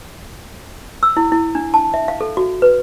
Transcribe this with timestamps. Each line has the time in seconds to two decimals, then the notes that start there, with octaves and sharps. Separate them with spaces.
1.03 E6
1.17 E4
1.32 E4
1.55 D4
1.74 A5
1.94 E5
2.08 F5
2.21 A4
2.37 F#4
2.62 B4